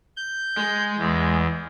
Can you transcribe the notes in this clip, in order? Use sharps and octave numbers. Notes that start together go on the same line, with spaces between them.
G6
G#3
E2